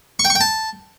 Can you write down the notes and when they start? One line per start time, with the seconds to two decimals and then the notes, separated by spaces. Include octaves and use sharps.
0.19 C#6
0.25 G5
0.30 C#6
0.35 G5
0.41 A5